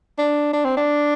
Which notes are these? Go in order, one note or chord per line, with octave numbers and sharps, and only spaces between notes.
D4
D4
C4
D4